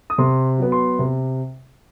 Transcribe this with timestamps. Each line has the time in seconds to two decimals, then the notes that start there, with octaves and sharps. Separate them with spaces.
0.10 D#6
0.18 C3 C6
0.58 F#3 B3
0.72 C6
0.99 C3